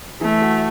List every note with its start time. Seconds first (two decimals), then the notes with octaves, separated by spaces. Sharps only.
0.21 E3 A3
0.42 F#4